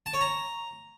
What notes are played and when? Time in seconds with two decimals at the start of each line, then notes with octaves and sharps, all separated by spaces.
0.06 A5
0.13 C#5
0.21 A#5